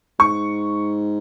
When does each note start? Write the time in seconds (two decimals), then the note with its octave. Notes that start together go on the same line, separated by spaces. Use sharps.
0.20 G#2 C#6